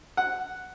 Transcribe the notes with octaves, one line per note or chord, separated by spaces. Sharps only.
F#5